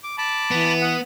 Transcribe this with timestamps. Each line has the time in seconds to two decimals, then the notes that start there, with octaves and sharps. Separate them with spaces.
0.04 D6
0.18 A5 B5 D6
0.51 E3 B3
0.82 F#5 D#6